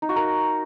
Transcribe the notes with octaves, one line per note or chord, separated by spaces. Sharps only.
D#4
F#4
A#4